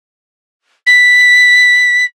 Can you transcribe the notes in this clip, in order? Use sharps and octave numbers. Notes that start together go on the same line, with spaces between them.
B6